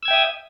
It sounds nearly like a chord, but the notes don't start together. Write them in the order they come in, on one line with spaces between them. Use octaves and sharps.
E6 G#6 G5 E5 D#6